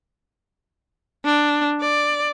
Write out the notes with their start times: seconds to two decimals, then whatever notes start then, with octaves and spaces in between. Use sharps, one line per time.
1.25 D4
1.81 D5